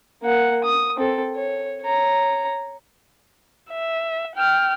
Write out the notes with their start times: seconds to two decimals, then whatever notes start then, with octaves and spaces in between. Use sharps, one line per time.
0.22 A#3 F#5
0.64 D#6
0.96 C4 A4
1.35 C#5
1.82 C#5 A#5
3.70 E5
4.35 G5 F6